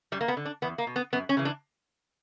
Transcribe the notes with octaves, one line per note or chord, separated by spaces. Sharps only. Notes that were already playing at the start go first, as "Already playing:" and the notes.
F#2 G3
A#3
B3
D3
D4
E2 B3
A#3
B2
B3
F#2 B3
C#4
C#3 E3
D4